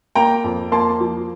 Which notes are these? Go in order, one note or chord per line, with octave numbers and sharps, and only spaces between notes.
A#3 G5 A#5
F2
A#3 A5 C6
F3